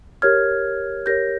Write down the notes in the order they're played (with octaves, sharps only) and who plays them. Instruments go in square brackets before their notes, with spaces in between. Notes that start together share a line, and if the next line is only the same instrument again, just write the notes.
[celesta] G4 A#4 C#5 F6 G#6
G4 A#4 C#5 G6 A#6